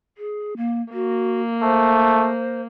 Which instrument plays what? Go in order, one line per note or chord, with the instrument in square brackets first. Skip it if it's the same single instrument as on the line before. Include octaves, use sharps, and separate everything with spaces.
[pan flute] G#4
A#3
[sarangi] A#3 [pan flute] F#4
[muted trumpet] A3 [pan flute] C5